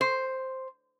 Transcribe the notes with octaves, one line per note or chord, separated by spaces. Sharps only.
C5